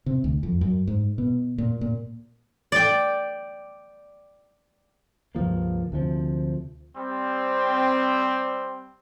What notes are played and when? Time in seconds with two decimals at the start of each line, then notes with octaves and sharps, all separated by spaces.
0.06 C3
0.24 D2
0.43 F2
0.61 F#2
0.87 G#2
1.18 B2
1.58 A#2
1.81 A#2
2.72 D5 G5
5.35 C#2 G2 F3 A#3
5.92 D2 C3 F3
6.96 G3 C4